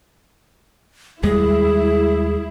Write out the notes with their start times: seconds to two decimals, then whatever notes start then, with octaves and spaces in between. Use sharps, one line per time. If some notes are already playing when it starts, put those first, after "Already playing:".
1.23 D#2 G3 G#3 E4 G#4